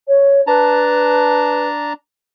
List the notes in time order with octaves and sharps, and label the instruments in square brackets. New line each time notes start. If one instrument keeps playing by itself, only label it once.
[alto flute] C#5
[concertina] D4 A5 A#5 [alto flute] B4